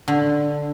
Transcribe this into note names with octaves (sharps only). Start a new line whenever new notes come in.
D3